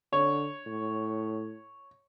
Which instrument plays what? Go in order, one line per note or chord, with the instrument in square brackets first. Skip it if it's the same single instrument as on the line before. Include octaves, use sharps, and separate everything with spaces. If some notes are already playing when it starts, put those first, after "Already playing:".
[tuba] D3 [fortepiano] C#5
[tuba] A2